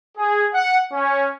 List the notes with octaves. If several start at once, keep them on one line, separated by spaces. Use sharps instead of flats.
G#4
F#5
C#4